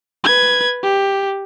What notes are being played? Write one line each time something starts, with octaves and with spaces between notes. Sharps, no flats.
B4 G#6
G4